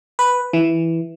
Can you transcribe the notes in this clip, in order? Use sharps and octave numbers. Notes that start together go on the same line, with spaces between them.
B4
E3